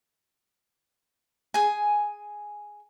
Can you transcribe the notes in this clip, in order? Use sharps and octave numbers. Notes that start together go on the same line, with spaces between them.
G#4 G#5